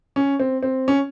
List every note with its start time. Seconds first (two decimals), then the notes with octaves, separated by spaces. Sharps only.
0.16 C#4
0.40 C4
0.63 C4
0.88 C#4